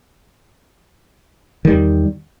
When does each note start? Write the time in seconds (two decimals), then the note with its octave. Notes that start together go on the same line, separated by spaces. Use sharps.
1.65 D#3
1.67 G3
1.70 E2